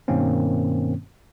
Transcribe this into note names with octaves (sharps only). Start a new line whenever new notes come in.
G2 B2 D#3 A#3 C4 C#4